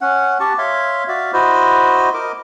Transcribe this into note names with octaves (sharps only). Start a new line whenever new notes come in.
C#4 F#5
G4 A5 C#6
C#5 E5 F5 C6
F#4 D5 E5 F5
E4 F#4 C5 D#5
A#4 D#5 D6